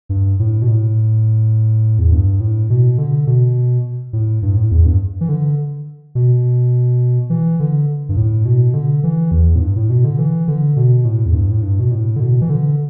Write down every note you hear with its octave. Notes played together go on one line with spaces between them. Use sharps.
G2
A2
B2
A2
E2
G2
A2
B2
D3
B2
A2
G2
A2
E2
G2
E3
D3
B2
E3
D3
G2
A2
B2
D3
E3
E2
A2
G2
A2
B2
D3
E3
D3
B2
A2
E2
G2
A2
G2
B2
A2
D3
B2
E3
D3